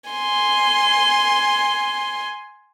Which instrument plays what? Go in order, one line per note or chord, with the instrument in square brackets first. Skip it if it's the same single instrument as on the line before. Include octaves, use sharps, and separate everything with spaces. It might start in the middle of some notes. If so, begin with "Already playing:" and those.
[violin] G#5 C6